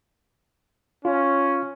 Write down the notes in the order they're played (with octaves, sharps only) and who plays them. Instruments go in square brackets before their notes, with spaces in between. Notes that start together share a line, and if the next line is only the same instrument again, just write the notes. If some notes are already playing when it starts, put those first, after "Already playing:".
[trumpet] C#4 [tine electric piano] F4